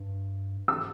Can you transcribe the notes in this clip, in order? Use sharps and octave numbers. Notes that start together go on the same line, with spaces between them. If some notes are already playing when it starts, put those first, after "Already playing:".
Already playing: G2
E6